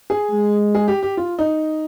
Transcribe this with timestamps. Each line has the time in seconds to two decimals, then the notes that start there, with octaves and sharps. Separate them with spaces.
0.10 G#4
0.31 G#3
0.75 G#4
0.88 G4
1.03 G4
1.17 F4
1.39 D#4